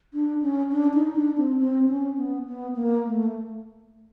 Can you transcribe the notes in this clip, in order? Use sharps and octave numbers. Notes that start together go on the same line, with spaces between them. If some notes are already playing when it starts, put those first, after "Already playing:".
D4
C#4
D4
D#4
D4
C4
C4
C#4
B3
B3
A#3
A3